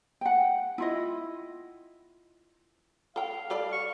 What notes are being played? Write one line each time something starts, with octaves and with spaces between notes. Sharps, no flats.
F#5 G5
E4 F4 D#5
A4 F5 G5
G3 A4 D5 F5
C#6